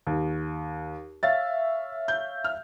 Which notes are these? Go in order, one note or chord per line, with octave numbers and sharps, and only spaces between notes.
D#2
C#5 E5 F5 A6
G6
F6